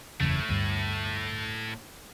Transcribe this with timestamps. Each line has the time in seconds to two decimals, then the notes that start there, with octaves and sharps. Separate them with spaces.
0.20 F#1 E2 A2 C#3 A3
0.49 D2 G2